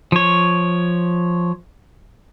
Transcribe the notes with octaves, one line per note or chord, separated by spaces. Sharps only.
F3 C#5